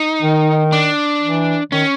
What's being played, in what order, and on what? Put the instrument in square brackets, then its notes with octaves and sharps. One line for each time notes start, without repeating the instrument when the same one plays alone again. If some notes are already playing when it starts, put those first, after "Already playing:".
Already playing: [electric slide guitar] D#4
[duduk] D#3
[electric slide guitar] D4
[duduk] E3
[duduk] D#3 [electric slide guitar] C#4